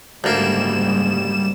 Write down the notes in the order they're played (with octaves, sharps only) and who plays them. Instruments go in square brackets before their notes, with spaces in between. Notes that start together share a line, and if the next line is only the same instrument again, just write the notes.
[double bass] F#1 G#2 [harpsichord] D2 A#3 [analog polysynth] G3 E7